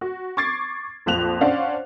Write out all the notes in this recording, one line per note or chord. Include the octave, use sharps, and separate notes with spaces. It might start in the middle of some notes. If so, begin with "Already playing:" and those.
F#4
C#6 D6 G#6 A6 C7 D7
A#1 F2 F3 F#6 F7
C#4 D4 C5 D5 F5 F#5